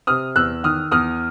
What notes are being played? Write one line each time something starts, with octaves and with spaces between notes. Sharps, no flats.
C3 D#6 F6
E2 E6 F#6
D#3 D#6 F6
E2 D#6 F6